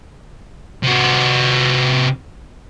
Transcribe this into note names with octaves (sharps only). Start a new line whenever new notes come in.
C3 F#4